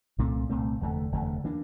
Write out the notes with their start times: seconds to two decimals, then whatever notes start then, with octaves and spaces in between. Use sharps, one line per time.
0.18 C2 A#2 A3 C4
0.49 C2 A#2 A3 C4
0.81 F1 E2 D3 A3
1.12 F1 E2 D3 A3
1.44 E3 A#3 D4